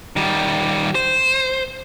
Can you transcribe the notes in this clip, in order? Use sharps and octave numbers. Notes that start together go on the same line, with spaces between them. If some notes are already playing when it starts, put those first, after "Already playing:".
D#3 G3
C5